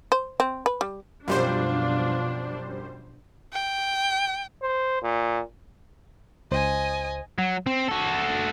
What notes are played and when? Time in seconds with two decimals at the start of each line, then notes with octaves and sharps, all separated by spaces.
0.12 C5
0.40 C4
0.66 B4
0.81 G3
1.28 F#2 B2 F3 G3 D4 F4 C5
3.53 G5
4.62 C5
5.02 A#2
6.51 C#2 C5 D#5 G#5
7.39 F#3
7.66 C4
7.88 F#4 A4